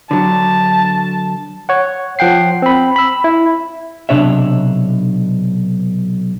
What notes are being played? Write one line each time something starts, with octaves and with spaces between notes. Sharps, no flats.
D3 F#3 A5
C#5 F#5
F3 F#5 G5 C7
C4 B5
B5 E6
E4
B1 C3 D4 C#5 E5